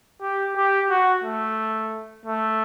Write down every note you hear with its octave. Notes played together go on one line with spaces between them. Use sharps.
G4
G4
F#4
A3
A3